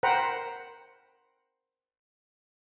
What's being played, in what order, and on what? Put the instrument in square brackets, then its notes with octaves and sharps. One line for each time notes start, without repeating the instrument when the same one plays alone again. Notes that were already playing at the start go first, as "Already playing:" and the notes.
[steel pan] A#4 C5 F#5 G5 A#5 B5